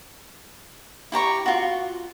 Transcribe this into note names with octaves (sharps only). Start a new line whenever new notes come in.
E4 G4 A#5 C#6
F4 F#4